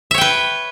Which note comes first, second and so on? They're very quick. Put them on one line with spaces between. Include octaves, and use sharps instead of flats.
E5 C#5 G5 B4